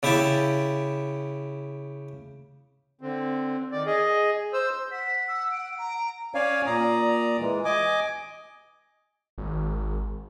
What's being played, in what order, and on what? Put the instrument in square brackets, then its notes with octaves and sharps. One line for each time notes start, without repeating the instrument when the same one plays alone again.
[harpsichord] C#3 E4 G4 E5 A5
[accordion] D3 C4
D#3 D5
G#4 D#5
C5 E6
[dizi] F#5 [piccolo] B6
[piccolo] E6
D7
[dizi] A#5
[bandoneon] C#4 C#5 D5 F5 G#5
A#2 D5 A#5 D#6
E3 G#3
D#5 G#5 D6
[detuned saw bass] G#1